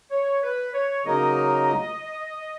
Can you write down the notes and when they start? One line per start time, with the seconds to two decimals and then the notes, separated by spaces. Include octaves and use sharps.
0.11 C#5
0.43 B4
0.74 C#5
1.05 C#3 F#3 A#3 D#4 A#4 D#5